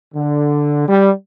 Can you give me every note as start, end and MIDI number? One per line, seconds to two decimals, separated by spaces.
0.15 0.88 50
0.88 1.10 55